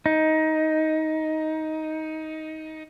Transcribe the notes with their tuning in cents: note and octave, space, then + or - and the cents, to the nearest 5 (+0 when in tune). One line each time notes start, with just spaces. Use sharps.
D#4 +15